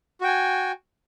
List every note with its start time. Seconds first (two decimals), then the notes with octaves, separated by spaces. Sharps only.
0.21 F#4
0.24 G5
0.27 G#5